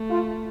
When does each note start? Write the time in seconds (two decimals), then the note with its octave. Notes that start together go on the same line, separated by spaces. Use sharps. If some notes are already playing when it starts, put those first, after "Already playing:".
Already playing: A3
0.09 F4